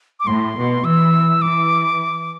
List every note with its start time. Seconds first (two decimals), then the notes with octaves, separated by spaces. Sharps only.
0.20 D6
0.27 A2 C6
0.56 B2
0.84 E3 E6
1.42 E3 D6